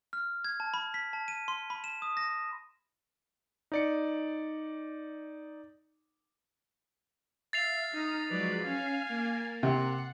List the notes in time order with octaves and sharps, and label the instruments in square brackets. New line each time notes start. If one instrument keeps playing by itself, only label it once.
[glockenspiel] F6
G#6
A5
B5
B6
A5
D#7
C6
B5
E7
D#6
A#6
[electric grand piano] D#4 D5 C#7
[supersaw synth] E5 F5 [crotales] A6 C7 F7
[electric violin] D#4 [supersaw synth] A#5 D#6 F6
[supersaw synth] F3 F#3 G#3 [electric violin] B4 D5
[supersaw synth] C#4 [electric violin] F5 G#5
[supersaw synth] A#3
[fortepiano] C3 [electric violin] F#5